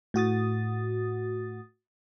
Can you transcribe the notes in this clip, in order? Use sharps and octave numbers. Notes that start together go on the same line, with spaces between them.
A2 F#4 D#6 A6